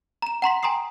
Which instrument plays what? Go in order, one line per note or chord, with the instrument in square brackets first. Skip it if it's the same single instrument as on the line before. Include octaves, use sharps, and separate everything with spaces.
[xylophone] A#5 E7
F#5 A#5 C6 B6
G5 G#5 A#5 C6 D#6 C7